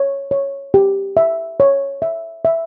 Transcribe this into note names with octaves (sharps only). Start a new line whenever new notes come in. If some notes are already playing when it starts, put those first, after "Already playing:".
Already playing: C#5
C#5
G4
E5
C#5
E5
E5